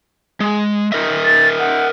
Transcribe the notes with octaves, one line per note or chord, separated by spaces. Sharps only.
G#3
A#4 D#5 E5
A6
F#5